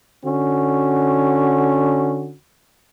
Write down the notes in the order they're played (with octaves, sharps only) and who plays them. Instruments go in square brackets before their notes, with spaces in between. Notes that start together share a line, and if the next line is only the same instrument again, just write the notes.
[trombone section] D3 C#4 F#4